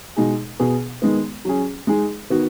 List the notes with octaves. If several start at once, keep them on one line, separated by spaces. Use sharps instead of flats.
B2 G#3 D#4 G#4
B2 B3 G#4
D#3 G#3 B3
F#3 C#4 G#4
G#3 D#4 G#4
D#3 B3 F#4